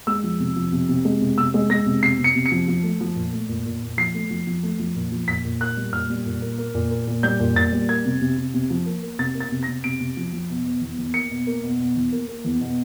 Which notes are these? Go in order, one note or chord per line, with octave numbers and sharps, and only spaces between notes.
G#3 E6
F3
C3
F3
C3
C3
G#3
C3
C3 E6
G#3
G#3 A#6
C3
C3 C7
C3
C#7
C3
C#7
F3
F3
A3
F3
A#2
A3
A#2
A#2
A#2
F3 C7
A3
F3
F3
A3
F3
A#2
F3
A#2 B6
A#2
A#3 F#6
G3
A#2 F6
G3
A#2
A#3
A#3
A#2
A#3
A#2
G3 G6
A#2
A#2 A6
G3
A#3 G#6
C3
C3
C3
C3
F3
A#3
A#3
C3 A6
A#3
A6
C3
A#6
C3
C3 D7
C3
F3
F3
B2
B2
E2
E2
A#3 C#7
B2
A#3
B2
B2
E2
A#3
A#3
E2
B2